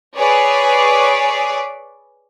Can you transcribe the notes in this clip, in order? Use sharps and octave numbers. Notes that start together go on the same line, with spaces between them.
G#4 B4 C#5 D5